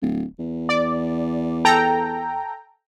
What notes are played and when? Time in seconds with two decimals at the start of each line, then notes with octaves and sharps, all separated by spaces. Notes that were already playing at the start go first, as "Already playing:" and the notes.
0.01 D1
0.39 E2
0.69 D5
1.65 A4 G5 A#5